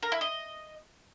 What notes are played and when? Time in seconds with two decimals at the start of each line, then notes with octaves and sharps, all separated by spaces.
0.03 A#4
0.12 E4
0.21 D#5